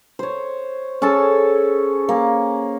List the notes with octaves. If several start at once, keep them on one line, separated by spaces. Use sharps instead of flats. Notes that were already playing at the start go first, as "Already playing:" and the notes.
C5 C#5
C#4 G#4 A4 A5
A#3 G#5